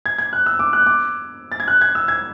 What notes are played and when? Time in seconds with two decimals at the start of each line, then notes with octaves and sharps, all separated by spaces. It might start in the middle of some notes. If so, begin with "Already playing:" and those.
0.06 G#6
0.18 G#6
0.33 F#6
0.46 E6
0.59 D6
0.73 F#6
0.86 D6
1.52 A6
1.60 G#6
1.68 F#6
1.81 G#6
1.95 E6
2.08 G#6